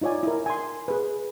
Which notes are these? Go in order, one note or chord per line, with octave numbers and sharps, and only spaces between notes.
D#4 F4 C#5 D5 G#5
E4 A#4
G#5 C6
G#4 B4